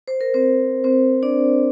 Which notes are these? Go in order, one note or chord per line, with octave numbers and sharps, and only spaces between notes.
C5
A#4
C4 C5
C4 C5
D4 D5